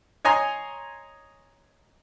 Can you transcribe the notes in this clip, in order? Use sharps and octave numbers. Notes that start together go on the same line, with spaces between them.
C#5 D#5 G#5 A#5 C6